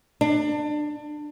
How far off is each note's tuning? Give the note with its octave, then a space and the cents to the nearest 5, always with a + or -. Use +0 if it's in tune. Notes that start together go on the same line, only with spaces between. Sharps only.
D4 +25